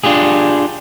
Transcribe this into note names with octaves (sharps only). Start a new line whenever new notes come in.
D4 F4 G4 G#4